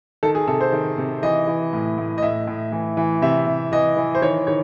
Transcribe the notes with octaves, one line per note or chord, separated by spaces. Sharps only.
D#3 A4
G#4
C3 A4
C5
D#3
C3
E3 D#5
E3
A2
A2
D#5
A2 E5
A2
E3
E3
C3 E5
C3
E3 D#5
E3
C5
D#3 C#5
D#3 C#5